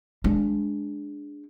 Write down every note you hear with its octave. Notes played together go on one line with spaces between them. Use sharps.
G#3 D4